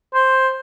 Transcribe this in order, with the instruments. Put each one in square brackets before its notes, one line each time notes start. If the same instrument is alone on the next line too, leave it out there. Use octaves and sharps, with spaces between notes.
[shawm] C5